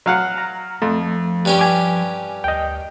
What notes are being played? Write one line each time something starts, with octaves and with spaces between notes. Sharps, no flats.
F#3 F5 F#5
A#5
F2 F3 A3
G2 C#4 G4
G#5 D6
D2 D#5 G5